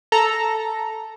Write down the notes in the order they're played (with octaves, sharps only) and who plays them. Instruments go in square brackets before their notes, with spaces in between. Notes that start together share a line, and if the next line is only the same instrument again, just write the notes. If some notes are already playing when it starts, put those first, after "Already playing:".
[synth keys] A4 A#5